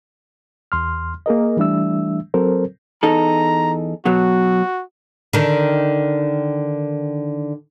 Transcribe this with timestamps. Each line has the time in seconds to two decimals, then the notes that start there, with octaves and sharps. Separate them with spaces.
0.72 E2 C6 F6
1.26 A#3 G#4 A#4 D#5
1.57 E3 G3 A3 D4 E5 E6
2.34 F#3 C4 A4 A#4 C5
3.03 E2 D#4 A4 A#5
4.05 B2 F#3 F#4
5.33 D3 D#3